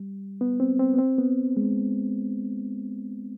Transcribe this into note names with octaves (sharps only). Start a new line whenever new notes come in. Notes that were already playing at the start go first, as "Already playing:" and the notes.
Already playing: G3
B3
C4
C4
B3
C4
B3
G#3